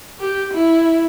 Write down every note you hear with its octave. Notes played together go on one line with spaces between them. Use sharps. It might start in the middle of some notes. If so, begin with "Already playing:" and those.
G4
E4